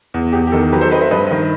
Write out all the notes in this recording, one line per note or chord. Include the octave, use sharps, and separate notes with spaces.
E2
E2 G4
G4
D#3 A4
F#3 G4 B4
A4 C5
C4 B4 D#5
C5 E5
G2 B4 D#5
D#3